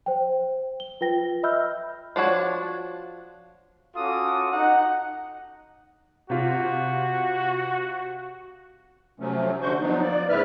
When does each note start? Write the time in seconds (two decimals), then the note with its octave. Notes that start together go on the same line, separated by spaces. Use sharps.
0.06 C5 G5
0.80 G7
1.01 F4 B4 G5 A#6 G7
1.43 D#5 E5 B5 E6 F6 G6
2.16 F3 D4 F#4 C#5
3.95 C#4 F4 F#4 A4 D6 D#6
4.52 D#4 F#5
6.30 C3 F4 F#4
9.20 C3 F3 F#3 A3 C#4
9.62 D3 D4 F#4 C5 C#6 G6
9.81 F3 F#3 B3 D4 D#4
10.02 A#3 D5
10.29 G#2 C#3 E4 B4 E5 F6